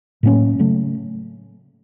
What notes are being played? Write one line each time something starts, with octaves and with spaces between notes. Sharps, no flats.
A2 F#3 A#3 C#4
C#3 F#3 A3